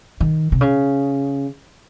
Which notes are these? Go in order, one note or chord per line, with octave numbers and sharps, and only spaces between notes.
D#3
C3
C#3